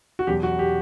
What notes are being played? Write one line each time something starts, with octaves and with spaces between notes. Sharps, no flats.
F#4
E2 B2 F#3 G4
F#4
G4